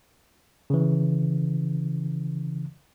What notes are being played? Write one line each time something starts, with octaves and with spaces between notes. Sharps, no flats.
C#3 E3